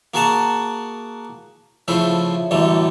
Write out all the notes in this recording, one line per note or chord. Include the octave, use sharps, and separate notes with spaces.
A#3 F#4 G#4 F#5 A5 A#5
C#3 F3 A3 E4 C5
A1 F#2 D3 G3 A3